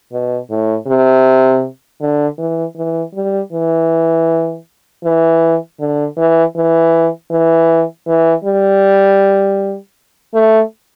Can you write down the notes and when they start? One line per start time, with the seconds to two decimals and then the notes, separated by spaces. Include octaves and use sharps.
0.12 B2
0.50 A2
0.87 C3
2.01 D3
2.38 E3
2.77 E3
3.14 G3
3.53 E3
5.04 E3
5.80 D3
6.18 E3
6.56 E3
7.31 E3
8.07 E3
8.44 G3
10.34 A3